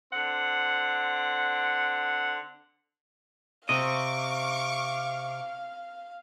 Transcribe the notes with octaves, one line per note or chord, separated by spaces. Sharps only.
D3 C4 F#5
C3 C4 D#5 F5 C#6 D6